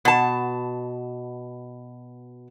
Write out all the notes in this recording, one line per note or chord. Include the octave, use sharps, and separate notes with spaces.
B2 A5